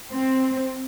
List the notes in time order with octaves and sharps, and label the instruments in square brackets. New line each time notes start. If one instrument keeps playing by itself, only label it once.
[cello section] C4